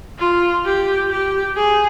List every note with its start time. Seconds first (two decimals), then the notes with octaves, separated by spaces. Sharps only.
0.19 F4
0.65 G4
1.11 G4
1.57 G#4